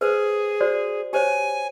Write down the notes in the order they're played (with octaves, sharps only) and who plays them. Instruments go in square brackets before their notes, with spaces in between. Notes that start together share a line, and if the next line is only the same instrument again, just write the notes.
[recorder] G#4 [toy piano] B4 C5
[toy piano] F#4 C5 D5
[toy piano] G4 C5 C#5 [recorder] G#5